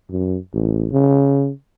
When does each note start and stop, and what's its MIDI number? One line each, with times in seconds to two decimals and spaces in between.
0.11 0.37 42
0.54 0.87 33
0.92 1.50 49